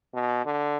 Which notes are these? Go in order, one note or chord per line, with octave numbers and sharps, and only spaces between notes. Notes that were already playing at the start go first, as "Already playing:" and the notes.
B2
D3